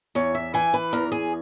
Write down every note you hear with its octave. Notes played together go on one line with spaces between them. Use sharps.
E2 C#5
E5
E3 G#5
B4
E2 A#4
G#4